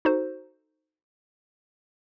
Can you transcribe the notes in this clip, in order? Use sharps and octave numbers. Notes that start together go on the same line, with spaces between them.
D#4 F#4 A4 C5